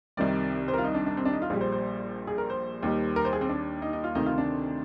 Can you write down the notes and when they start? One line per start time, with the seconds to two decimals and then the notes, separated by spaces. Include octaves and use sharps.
0.17 C2 C3 D#3 G3 D5
0.68 C5
0.73 F4 A#4
0.84 D#4
0.94 D4
1.06 D4
1.17 C4
1.25 D4
1.33 D#4
1.42 F4
1.50 A#1 A#2 G3 G#4
1.61 C5
1.72 C5
2.27 G#4
2.38 A#4
2.50 C5
2.83 D#2 D#3 G3
3.16 A#4
3.25 C5
3.33 G#4
3.41 C4
3.49 D4
3.82 D#4
3.93 D#4
4.04 F4
4.15 D2 C3 D#3 D#4
4.26 F4
4.38 D4